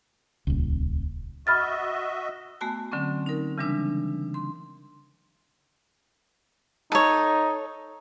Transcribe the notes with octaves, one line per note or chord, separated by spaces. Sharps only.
D#1 C#2
F#4 D#5 E5 B5 F6 A6
A3 B3 F#4 G#5 A5
D3 F#3 C4 C#4
D#4 A#4
C#3 E3 G3 G#3 D4 E6
C6
D#4 A4 C#5